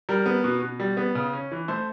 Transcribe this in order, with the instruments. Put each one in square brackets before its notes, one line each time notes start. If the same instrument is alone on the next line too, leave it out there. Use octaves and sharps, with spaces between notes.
[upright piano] G3 A#4
B3
B2
B2
G3
B3
C#3
C#4
E3
A3 C5